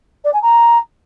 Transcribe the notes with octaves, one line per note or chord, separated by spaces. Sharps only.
D5
G#5
A#5